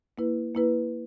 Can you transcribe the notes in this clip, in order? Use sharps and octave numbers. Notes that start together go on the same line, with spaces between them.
A#3 E4 B4
A#3 E4 B4